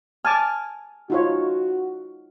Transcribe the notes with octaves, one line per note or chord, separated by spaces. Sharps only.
G#5 A5 D6 F6
D#4 F4 F#4 C#5